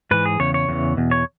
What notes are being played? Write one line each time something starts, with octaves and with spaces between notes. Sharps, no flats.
G#2 E3 B4
G#4
E2 C#3 C#5
C#5
E2 C#3 E3
E2 B2
C#5